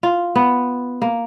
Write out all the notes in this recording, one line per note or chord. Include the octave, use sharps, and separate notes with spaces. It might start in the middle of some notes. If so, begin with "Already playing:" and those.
F4
B3
A#3